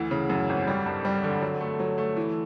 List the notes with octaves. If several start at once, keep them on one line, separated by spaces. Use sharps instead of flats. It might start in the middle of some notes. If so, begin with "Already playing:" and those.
Already playing: D2 E3
C#3
F#2
G#1
G3
G2
G3
D3
F#3
A3
F#3
A3
E3